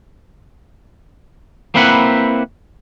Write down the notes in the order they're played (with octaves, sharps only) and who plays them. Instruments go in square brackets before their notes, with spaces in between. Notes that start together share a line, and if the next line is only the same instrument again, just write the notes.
[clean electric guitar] A#3 C4 E4 B4 F#5